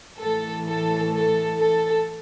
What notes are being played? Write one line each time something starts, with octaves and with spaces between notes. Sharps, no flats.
A2 E3 A4
A4
A4
A4